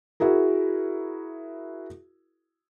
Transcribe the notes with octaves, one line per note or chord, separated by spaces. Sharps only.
E4 F#4 G#4 A#4